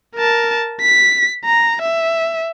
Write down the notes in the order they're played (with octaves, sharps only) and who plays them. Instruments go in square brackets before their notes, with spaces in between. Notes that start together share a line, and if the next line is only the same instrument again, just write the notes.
[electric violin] A#4 A5
B6
A#5
E5